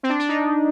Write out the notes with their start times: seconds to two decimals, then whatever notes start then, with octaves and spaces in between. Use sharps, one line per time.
0.03 C4
0.09 D4
0.20 D4
0.29 D#4